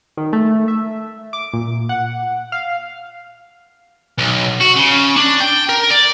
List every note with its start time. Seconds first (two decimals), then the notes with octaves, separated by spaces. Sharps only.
0.17 D#3
0.33 A3
0.68 E5
1.33 D6
1.53 A#2
1.89 F#5
2.52 F5
4.18 B1
4.60 F#4
4.76 C#3
5.16 D4
5.40 G5
5.69 A#4
5.91 D5